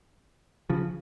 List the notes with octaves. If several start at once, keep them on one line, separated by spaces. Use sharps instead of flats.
C#3 F3